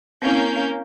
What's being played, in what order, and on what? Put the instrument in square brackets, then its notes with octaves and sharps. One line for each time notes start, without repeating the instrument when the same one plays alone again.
[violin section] A#3 C#4 G6 [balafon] C4 E4